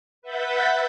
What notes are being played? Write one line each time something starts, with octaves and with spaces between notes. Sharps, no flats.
B4 E5 F#5 G6 A6 B6